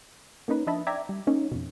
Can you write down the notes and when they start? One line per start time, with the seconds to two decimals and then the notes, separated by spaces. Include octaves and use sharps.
0.48 A#3 C#4 D#4 B4
0.67 F3 D4 D#5 E5 A5 B5
0.87 D5 E5 G5 A#5 D6 G#6
1.09 G3
1.27 A#3 C#4 D#4
1.51 F2 B2